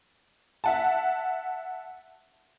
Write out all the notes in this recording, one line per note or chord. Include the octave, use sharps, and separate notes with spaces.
E5 F#5 A5